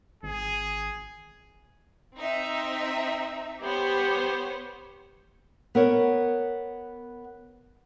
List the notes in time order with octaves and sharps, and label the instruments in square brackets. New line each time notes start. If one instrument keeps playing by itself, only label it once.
[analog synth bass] G#1 [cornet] G#4
[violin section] C4 D#4 E5
[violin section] B3 C5 C#5 [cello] G4
[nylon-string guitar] B3 A#4 C#5